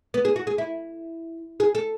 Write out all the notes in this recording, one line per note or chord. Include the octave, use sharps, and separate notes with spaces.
B3
G#4
F#4
G#4
E4
G#4
A4